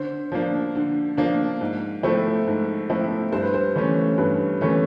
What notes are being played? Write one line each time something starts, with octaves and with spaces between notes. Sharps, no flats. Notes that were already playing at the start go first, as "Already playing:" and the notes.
Already playing: D3 C5
F3 A#3 D4
D3
F3 A#3 D4
G#2
F3 A3 C4 E4
G#2
F3 A3 C4 E4
G2 C5
B4
C5
E3 A3 C#4
G2 B4
E3 A3 C#4